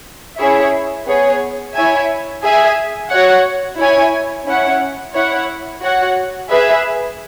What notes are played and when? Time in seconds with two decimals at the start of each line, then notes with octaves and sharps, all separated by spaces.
0.38 C#4 E4 G#4 C#5 E5
1.06 B3 G#4 C#5
1.74 E4 C#5 E5 G#5
2.43 G#4 E5 G#5
3.10 F#4 C#5 F#5
3.78 E4 C#5 G#5
4.46 C#4 E4 C#5 F#5
5.14 E4 C#5 F#5
5.81 F#4 C#5 F#5
6.49 G#4 B4 E5